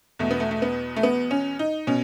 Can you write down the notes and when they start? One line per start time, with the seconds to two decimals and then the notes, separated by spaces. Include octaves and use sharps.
0.19 E2 B2 A3
0.31 B3
0.40 A3
0.51 A3
0.62 B3
0.96 A3
1.03 B3
1.31 C#4
1.59 D#4
1.87 B2 C#4